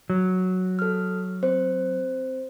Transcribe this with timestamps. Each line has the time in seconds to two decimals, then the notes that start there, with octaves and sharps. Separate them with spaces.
0.10 F#3
0.79 A4 F6
1.43 C4 C5